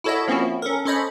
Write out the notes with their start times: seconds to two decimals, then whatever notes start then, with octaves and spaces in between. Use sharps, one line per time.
0.04 E4 F#4 A4 C#5 D#5 E5
0.28 F3 A#3 C4 C#4 E4 F#4
0.62 C#4 A4 A#4
0.85 C#4 A4 C5 C#5 D#5 B5